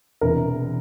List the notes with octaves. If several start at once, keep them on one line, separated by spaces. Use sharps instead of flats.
E1 E2 C3 A#4